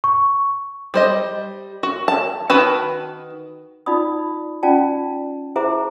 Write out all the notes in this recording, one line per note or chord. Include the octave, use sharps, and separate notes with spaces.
C#6
G3 C5 D#5
F#4
A5
D#3 F#4 B4 A5
D#4 F4 D5 B5 D#6
C#4 F4 D5 G5 A5
E4 G#4 C5 E5 A#5 D6